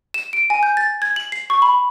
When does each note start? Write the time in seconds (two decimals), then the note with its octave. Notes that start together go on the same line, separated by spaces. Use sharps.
0.14 E7
0.33 D7
0.50 G#5
0.63 G6
0.77 A6
1.02 G#6
1.16 F#7
1.32 C7
1.50 C#6
1.62 B5